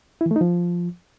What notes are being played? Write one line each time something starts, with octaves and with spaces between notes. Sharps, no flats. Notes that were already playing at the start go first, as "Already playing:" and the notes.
E4
E3
A3
D#4
F3